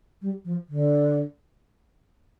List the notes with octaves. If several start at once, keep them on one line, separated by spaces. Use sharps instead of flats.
G3
F3
D3